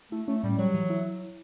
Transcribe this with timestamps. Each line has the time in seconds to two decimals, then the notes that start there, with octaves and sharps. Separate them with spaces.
0.12 A3 E4
0.27 A3 C#4
0.43 A2 G3
0.58 F#3 G3
0.74 E3
0.90 E4